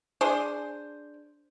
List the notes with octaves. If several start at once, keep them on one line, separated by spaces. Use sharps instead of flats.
D4 G#4 C5